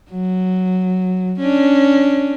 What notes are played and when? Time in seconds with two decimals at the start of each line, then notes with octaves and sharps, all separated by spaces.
0.10 F#3
1.39 C#4 D4